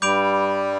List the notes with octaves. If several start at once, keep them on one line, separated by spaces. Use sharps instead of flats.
G2 G3 B5 D6 G6 D7 F7